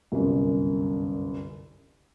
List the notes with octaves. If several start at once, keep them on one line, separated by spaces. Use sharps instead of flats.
G1 C2 F#2